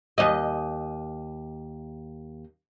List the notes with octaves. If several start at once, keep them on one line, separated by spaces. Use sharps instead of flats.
D#2 D#5